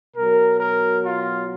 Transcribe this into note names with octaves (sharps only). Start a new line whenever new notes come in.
B2 F#3 A#4
A#4
F4